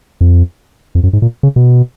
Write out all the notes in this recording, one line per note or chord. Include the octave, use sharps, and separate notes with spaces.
F2
F2
F#2
G#2
A#2
C#3
B2